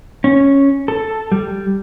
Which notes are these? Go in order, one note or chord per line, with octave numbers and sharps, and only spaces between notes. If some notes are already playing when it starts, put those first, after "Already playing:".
C#4
A4
G3